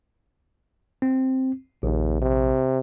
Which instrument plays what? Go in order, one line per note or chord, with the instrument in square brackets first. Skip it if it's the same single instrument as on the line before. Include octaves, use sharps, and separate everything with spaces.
[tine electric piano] C4
[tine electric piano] A#1 [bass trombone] D#2
[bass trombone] C3